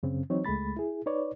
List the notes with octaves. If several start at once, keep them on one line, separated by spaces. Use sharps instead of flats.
F#2 C#3 C4
E3 F#3 C4 D#4 C#5
C#2 G#3 A3 B5 A6
E4 G#4
D#4 B4 C#5 D5